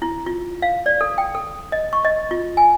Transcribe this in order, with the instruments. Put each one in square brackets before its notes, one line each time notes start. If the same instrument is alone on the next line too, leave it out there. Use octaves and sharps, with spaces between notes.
[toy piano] E4
F4
F5
D5
A4
G5
A4
D#5
C#6
D#5
F4
G#5